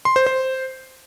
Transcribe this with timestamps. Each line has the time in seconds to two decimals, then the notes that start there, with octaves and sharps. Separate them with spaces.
0.05 C6
0.16 C5
0.27 C5